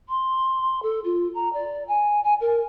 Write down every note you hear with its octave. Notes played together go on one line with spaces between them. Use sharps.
C6
A4
F4
A#5
D5
G#5
G#5
A#4